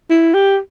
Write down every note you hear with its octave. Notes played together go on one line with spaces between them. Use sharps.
E4
G4